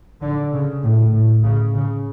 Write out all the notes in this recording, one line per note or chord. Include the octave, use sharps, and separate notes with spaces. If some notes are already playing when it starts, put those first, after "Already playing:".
D3
C#3
A2
A2
C#3
C#3